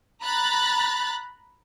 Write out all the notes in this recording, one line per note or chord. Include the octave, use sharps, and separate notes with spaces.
A#5 B5 F#6 A6